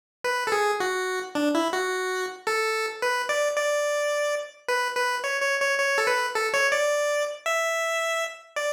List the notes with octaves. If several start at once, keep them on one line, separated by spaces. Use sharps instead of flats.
B4
A4
G#4
F#4
D4
E4
F#4
A4
B4
D5
D5
B4
B4
C#5
C#5
C#5
C#5
A4
B4
A4
C#5
D5
E5
D5